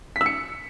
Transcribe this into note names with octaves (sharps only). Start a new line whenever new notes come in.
B6
E6
C#7